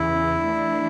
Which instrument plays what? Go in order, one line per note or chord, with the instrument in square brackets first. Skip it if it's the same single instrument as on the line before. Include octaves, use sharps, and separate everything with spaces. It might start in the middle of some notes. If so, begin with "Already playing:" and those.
Already playing: [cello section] E2 C#3 E3 [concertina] E4
[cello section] E3 A3 D4